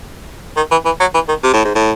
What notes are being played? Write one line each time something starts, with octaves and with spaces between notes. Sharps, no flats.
D#3
E3
E3
F#3
E3
D#3
C3
A2
G#2
A2